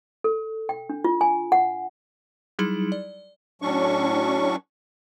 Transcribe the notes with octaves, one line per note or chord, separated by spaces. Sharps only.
A4
G5
D4
F4
G#5
F#5
F#3 G3 D#4 E4 G#4 F#7
D5
A2 F#3 C#4 D4 C#6